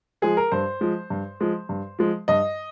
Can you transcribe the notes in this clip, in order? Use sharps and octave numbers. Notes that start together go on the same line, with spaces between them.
F3 G#3 G#4
A#4
G2 C5
F3 G#3
G2
F3 G#3
G2
F3 G#3
G2 D#5